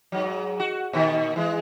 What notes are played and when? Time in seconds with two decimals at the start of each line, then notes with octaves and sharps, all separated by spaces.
0.12 G#2 F#3
0.60 F#4
0.93 A#2 D#3
1.36 E3 G#3